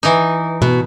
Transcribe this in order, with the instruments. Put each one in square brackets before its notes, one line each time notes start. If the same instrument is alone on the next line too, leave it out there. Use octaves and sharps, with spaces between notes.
[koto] E3 D#4
[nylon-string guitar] B2